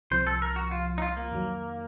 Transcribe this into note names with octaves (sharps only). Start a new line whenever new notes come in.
C2 C3 F3 C5
A4
A#4
F#4
F4
D#4
F4
A#3
F2 D#3 F#3